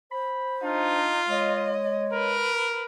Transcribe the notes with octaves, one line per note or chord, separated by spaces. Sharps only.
C5 B5
D4 D#4 F4
G#3 C#5 D#5
A#4 B4